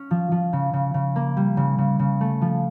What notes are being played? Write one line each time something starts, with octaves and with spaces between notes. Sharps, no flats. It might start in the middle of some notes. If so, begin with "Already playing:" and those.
Already playing: C#4
F3
F3
C#3
C#3
C#3
A#3
G3
C#3
C#3
C#3
A3
F3